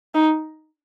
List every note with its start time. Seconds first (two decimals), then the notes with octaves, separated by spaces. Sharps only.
0.15 D#4